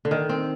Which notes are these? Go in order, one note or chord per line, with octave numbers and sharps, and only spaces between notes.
D3
D#3
C4